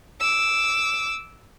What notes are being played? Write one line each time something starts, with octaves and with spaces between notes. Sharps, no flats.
D6 E6